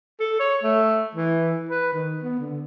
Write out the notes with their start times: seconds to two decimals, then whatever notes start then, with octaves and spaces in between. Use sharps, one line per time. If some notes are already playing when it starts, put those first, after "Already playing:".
0.20 A4
0.40 C#5
0.63 A3
1.15 E3
1.70 B4
1.93 D#3
2.23 B3
2.39 D3